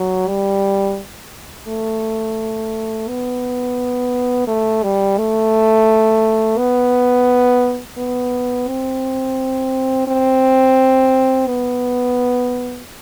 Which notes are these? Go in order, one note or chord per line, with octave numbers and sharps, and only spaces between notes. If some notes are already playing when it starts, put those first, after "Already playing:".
Already playing: F#3
G3
A3
B3
A3
G3
A3
B3
B3
C4
C4
B3